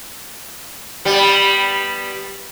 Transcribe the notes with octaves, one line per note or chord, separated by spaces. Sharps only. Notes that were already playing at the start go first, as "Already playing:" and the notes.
G3 B3